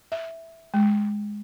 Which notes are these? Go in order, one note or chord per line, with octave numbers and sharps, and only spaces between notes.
E5
G#3